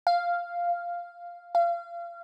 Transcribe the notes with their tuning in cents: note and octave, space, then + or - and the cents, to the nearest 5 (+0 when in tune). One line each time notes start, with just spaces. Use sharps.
F5 -5
F5 -30